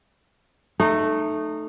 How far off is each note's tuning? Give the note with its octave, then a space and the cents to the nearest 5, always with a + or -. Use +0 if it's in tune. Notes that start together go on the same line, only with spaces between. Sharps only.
A3 +0 D#4 -20